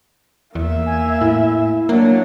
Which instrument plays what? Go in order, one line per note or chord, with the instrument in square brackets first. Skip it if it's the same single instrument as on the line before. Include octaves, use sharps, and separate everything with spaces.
[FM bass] E2 [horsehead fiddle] A#3 E5
[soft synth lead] G#5
[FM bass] A2 [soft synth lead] E4
[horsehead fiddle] F#3 D4 [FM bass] A#3